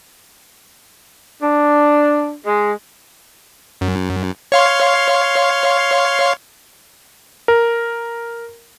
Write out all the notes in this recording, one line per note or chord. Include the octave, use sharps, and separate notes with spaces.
D4
G#3
F#2
C#5 F5 C6
A#4